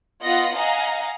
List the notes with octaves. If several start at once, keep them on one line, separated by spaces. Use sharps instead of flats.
B3 F4 D#5 F#5 A#6
D#5 F5 F#5 G#5 A#5